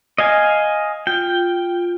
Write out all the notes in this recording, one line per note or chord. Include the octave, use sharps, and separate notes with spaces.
D#5 F5 G#5
F4 G5